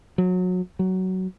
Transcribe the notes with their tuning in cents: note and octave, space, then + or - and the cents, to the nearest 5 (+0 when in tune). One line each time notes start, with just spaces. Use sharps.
F#3 -25
F#3 +15